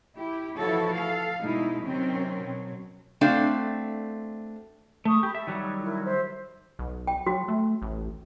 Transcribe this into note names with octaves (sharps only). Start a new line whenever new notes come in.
E4 G4
E3 F3 E4 F#4 A4 C#5
A4 F5
B2 G3 G#3 D#4 E4
C3 D#3 F#3 C4 C#4
B2 F#3
A3 C4 D4 F#4 F5
A3 C#6 D#6
G4 B5
A4 E5
D#3 F#3 G3
E4 A#4
C5 E5
B1
G5
F#3 F#4
A3
A1